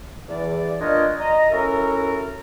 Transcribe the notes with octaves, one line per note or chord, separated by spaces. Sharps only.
E2 E3 D5
A#2 D4 F4 A#4 C#5 D#5
D#5 A#5
C#4 E4 F#4 A4 A#4